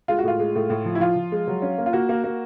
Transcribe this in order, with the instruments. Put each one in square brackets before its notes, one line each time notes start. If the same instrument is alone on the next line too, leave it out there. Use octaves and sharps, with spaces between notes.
[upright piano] G#3 F4
F#4
A2 F4
G#3
A2
A2
F3
E4
F3 F4
F3
G#3
F#3
C#4
A#3
F4
A#3 F#4
A#3
A#3